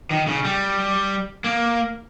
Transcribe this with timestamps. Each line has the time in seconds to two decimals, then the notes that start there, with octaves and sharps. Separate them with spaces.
0.11 D#3
0.27 C#3
0.44 G3
1.44 A#3